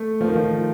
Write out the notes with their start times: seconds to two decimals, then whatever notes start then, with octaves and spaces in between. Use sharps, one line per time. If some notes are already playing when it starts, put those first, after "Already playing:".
Already playing: A3
0.21 F3
0.28 D#3
0.35 F3